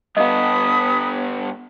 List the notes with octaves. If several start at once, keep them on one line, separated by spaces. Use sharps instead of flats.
G2 B3 D#5 F5 A5 B5 D#6